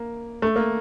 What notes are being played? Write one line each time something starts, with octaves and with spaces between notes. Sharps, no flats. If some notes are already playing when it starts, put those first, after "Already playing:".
Already playing: A#3
A3
A#3